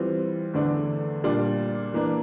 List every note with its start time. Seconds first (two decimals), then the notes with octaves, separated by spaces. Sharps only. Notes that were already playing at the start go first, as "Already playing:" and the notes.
Already playing: E3 G3 C4 F4
0.54 E2 D3 A3 D4
1.24 A#2 G3 D4 F4
1.94 E3 A#3 D4